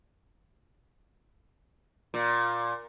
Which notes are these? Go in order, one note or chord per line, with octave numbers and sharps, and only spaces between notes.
A#2